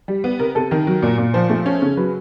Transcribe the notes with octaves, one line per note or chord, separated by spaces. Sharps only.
G3
B3
C3 A#4
C3 A4
D#3 A#4
F#3
A#2
A#2
F3 C5
A3
C#4
C#3
F#3 B4